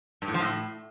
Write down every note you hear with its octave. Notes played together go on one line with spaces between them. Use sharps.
G2
A2
F3
A2